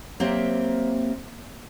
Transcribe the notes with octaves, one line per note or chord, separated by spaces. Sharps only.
F#3 A#3 C4 G4 E5